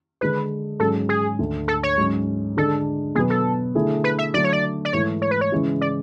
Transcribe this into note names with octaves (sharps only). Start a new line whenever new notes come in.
D3 G#3 D4 G#4 B4
G#2 F#3 C#4 G#4 A4
G#4
D2 D3 A3
A4
C#5
G#2 F#3 C#4
D3 G#3 D4 A4
B2 F#3 B3 G#4
A4
D3 A3 E4 G#4
B4
E5
D3 F#3 A3 D5
C#5
D5
D5
G#2 E3 A3 C#5
C#5
B4
C#5
C#3 E3 G#3 C#4 E4
D5